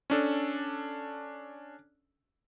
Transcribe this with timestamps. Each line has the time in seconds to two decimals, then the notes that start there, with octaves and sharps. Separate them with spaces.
0.10 C#4 D4 A4